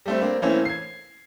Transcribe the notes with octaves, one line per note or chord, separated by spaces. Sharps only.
G3 A3 C4
A#3 C4 D4
E3 A3 A#3 C4 C#4
G#6 C7